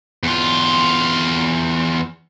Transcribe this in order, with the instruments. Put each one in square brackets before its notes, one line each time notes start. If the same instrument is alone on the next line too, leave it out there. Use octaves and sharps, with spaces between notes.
[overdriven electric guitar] E2 F4